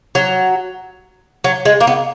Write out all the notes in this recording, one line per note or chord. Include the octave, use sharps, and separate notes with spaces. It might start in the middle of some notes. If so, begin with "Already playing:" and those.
F#3
F#3
G#3
A#3
B3